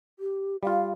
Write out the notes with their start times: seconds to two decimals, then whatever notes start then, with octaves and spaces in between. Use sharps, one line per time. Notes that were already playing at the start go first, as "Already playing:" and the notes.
0.19 G4
0.63 G3 F4 F5